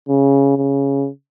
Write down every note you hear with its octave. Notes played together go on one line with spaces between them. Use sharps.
C#3
C#3